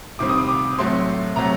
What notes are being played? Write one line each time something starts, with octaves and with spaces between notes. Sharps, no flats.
C3 D#3 G3 C4 D6
D#6
D6
D6
A2 F#3 A3 C4 C6
C3 F#3 A3 A#5